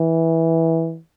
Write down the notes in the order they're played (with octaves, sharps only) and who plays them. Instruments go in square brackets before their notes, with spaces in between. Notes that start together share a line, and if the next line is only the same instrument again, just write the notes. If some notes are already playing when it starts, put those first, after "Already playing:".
Already playing: [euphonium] E3